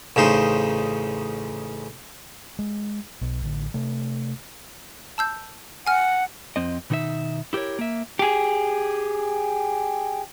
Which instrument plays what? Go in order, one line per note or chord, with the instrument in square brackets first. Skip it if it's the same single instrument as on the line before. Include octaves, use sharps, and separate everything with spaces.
[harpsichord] A1 C#3 D#4 C5
[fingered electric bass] G#3
B1 B2
A1 D3
C3 A3
[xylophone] A5 E6 G6
[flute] F#5 [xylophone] G#5 F6
[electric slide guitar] F2 C4 D#5
B2 D#3 D#4 A4 E5
E4 G4 A4 A#4 C#5
A#3 E5
[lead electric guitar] G4 G#4